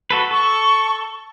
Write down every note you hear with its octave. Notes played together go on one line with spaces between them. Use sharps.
F#4 A4 B4
A4 C#6